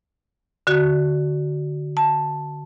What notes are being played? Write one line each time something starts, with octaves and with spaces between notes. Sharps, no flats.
D3 F#4
A5